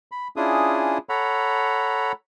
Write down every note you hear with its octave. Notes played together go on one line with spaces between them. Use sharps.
B5
C#4 D4 E4 F4 G#4 D#6
A4 C#5 F#5 A#5 B5